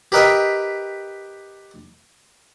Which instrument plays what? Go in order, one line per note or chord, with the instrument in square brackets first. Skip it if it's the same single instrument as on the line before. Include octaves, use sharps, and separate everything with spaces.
[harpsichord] G4 A#4 B4 D#5 E5 G5